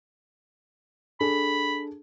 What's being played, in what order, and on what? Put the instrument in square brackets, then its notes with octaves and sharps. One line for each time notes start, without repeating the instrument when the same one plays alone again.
[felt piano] D4 G#4 A4 [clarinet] B5